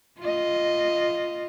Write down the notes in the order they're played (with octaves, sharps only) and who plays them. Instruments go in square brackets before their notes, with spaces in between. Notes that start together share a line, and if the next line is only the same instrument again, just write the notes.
[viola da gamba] F4 D#5